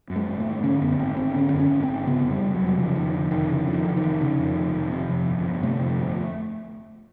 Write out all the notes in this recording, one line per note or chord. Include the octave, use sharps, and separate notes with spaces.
F#2
G#3
G#1
A3
G#1
D3 C#4
F#2 B3
G#1 C4
G#1 C4
D3 C#4
F#2
C#4
G#1
C4
G#1
C#3 B3
F2
G3
F1
F#3
F1
F#3
C#3 F3
F2 D#3
F1 D3
F1 D#3
C#3 E3
F2
D#3
F1 D3
D#3
F1
C#3
F2
F1
F1
C3
F2
G1
G1
C3 A3
F2
G1